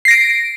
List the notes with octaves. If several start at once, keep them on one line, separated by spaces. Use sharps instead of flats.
A#6 C7 D7